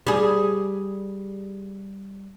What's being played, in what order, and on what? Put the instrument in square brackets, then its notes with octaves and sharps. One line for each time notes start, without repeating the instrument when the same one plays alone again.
[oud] G3 G#4